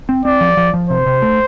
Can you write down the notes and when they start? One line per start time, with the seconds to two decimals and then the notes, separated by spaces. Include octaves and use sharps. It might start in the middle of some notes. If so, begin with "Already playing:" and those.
0.09 C4
0.25 C4 D5
0.41 F3
0.57 F3
0.74 F3
0.90 C3 C5
1.06 C3
1.22 A3